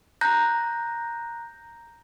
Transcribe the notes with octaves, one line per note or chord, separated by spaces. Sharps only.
A#5 F#6 G6 A#6